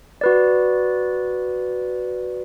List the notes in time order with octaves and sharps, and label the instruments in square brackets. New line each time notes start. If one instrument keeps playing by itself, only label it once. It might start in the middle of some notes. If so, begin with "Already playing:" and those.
[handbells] F#4 B4 D5